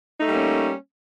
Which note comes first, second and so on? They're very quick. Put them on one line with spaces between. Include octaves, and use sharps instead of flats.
D#4 A3 G3 A#3 C#4